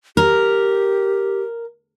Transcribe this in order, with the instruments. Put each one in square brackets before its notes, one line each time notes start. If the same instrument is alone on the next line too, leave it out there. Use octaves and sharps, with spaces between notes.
[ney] G4 [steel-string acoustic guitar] A#4